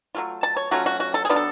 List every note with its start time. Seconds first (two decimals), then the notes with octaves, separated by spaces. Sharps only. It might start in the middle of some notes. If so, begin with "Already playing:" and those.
0.15 F#3 A3 F4
0.43 A5
0.56 C#5
0.71 F#3 A3 C#4 F4 F#4
0.86 F#4
1.00 F#4
1.14 A4
1.25 G#4
1.29 F#3 B3 D4 F4
1.36 A4